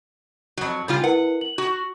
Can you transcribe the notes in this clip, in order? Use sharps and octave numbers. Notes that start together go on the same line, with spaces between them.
F2 F#3
C#3 G3 F4
E4 A#4 B4 F#5
F#7
F#4